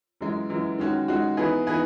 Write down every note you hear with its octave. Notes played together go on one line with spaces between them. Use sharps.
F#2 E3 G#3
F#2 E3 G#3
D#3 G#3 C#4 F#4
D#3 G#3 C#4 F#4
E3 B3 D#4 G#4 B4
E3 B3 D#4 G#4 B4